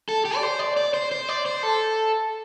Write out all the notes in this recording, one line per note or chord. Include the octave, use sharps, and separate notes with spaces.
A4
G4
D5
C5
D5
D5
C5
C5
D5
C5
A4